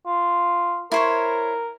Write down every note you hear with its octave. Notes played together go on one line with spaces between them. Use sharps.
F4
E4 A#4 C5 C#5